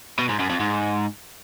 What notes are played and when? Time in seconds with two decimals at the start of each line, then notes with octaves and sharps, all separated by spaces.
0.19 B2
0.29 G#2
0.39 F#2
0.50 F2
0.60 G#2